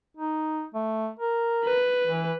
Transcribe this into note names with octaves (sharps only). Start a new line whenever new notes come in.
D#4
A3
A#4
B4
E3